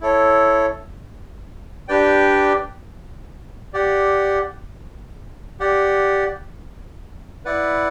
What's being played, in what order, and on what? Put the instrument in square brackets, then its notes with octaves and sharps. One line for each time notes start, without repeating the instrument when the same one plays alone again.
[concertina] E4 A4 C#5
D4 G4 B4 D5 G5
G4 D5 F#5
G4 D5 F#5
E4 B4 D5 F#5